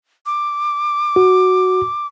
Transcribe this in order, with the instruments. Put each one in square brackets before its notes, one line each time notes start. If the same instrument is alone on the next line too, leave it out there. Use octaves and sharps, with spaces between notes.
[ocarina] D6
[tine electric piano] F#4